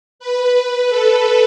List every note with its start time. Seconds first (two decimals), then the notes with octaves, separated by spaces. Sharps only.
0.20 B4
0.90 A4